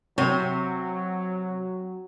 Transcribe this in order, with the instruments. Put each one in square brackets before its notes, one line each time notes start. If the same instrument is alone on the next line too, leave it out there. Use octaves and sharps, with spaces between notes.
[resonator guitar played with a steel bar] C3 [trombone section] F#3 [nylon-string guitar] C4 F#4 [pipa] C#5